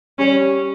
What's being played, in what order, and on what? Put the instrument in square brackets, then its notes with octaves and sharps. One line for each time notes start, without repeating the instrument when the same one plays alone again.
[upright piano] G3 [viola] C#4